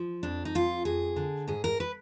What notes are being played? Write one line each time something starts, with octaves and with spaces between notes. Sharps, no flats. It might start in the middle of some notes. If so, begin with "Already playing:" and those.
Already playing: F3
F2 D4
D#4
F2 F4
F2 G#4
D3
G#2 G#4
A#4
B4